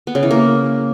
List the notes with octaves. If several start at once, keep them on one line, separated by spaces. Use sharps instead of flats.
B3
C#3
E3
A#3